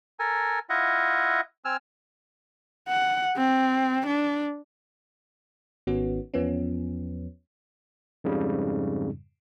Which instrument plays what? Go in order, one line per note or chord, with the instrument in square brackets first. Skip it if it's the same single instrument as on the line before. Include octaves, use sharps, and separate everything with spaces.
[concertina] A4 A#4 G#5
E4 F4 D#5 E5 F#5
C4 G#5 E6 F6
[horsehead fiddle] F#5
C4
D4
[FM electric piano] G#1 D#3 B3 C#4 F#4
E2 F3 B3 C#4
[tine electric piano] F2 G#2 C#3 G3